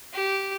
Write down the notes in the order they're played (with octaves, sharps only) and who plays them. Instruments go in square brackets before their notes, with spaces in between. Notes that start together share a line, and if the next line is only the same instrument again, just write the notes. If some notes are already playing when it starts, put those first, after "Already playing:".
[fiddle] G4